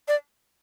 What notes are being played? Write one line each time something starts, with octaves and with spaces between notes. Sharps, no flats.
D5